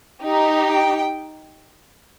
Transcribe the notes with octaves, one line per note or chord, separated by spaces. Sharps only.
D#4 G4
G5